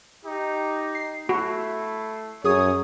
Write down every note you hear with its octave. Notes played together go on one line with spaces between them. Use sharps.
D#4 G4
C7
A3 E4 F#4
F#2 G#4 C#5 D#6